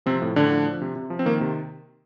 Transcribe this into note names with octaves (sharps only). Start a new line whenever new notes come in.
C3 F3 C4
A2
A2 D3 D4
F3
F3
C3
C3
F3
C4
D#3 A#3
C3